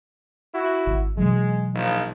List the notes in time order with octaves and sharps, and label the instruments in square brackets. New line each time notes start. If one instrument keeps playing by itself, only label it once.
[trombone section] E4 F#4
[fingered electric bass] G#1
[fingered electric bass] B2 E3 F#3 [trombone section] G#3
[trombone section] A#1 F3 D#4